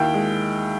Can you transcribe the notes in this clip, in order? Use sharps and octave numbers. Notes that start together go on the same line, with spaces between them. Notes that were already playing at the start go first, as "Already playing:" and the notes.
Already playing: D#2 E4 G5
G#3